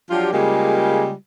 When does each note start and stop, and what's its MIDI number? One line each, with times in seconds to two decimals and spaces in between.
0.11 0.32 53
0.11 0.32 54
0.11 0.32 62
0.11 0.32 65
0.11 0.32 67
0.33 1.12 49
0.33 1.12 55
0.33 1.12 56
0.33 1.12 58
0.33 1.12 65
0.33 1.12 67